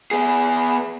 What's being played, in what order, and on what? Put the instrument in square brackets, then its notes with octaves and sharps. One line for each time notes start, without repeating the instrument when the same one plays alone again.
[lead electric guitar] B3 G#4